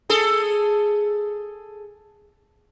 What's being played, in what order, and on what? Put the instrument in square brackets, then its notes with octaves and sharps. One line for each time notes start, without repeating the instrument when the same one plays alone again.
[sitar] G#4 A4